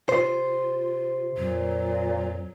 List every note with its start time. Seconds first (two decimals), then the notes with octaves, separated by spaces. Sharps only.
0.09 C3 F4 C5
1.37 F2 A#2 F#3